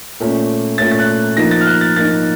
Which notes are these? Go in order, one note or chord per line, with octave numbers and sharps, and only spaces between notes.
A#2 A3 C#4
A#2 A3 C#4 A6
A6
F#6
F3 A#3 D#4 A#6
A6
F6
F#6
A6
F3 A#3 D#4 A6